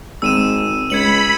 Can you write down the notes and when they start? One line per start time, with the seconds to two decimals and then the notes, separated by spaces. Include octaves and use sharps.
0.22 G#1 E6 D#7 E7
0.90 C#2 B5 G#6 C#7 F#7